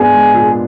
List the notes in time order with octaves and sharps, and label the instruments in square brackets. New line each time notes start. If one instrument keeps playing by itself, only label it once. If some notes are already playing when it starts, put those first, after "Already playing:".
Already playing: [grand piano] G#2 B3 D4 [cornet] G#4
[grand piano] G#3
A#2